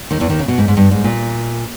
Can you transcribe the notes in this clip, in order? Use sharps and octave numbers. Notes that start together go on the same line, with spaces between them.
D#2 D#3
E2 E3
D#2 D#3
C#3
B2
G#2
G#2
G2
G#2
A#2